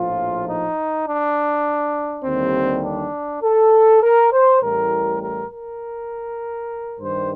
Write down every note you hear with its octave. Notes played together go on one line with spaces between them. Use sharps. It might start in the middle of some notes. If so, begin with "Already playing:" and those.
Already playing: A#1 A2 F3 F4
D#4
D4
D#2 D3 G3 C4
D4
A4
A#4
C5
A1 A2 G3 A#4
A#4
A#4
G2 D#3 G3 C5